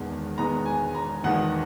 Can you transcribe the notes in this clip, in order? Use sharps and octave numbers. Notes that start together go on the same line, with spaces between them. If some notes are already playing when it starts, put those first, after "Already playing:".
Already playing: E1 E2 D#3 G#3 B3
E1 E2 D#3 G#3 B3 A#5
G#5
A#5
E1 E2 D#3 G#3 B3 F#5